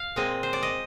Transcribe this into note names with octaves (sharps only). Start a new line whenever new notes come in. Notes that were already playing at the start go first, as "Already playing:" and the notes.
Already playing: F5
A#2 G#3 C4 D#5
C5
D5
D#5